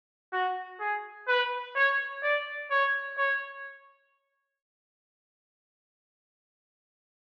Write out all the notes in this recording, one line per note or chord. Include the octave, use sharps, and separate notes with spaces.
F#4
G#4
B4
C#5
D5
C#5
C#5